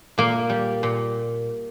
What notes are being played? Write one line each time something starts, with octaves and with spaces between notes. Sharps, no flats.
A#2 A#3
G3
A#2